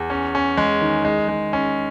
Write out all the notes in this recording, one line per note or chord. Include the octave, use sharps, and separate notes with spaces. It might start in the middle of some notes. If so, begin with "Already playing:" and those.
Already playing: E2
C#4
C#4
G#3
D#3
G#3
G#3
C#4